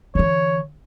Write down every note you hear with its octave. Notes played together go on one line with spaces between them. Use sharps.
D3 E3 C#5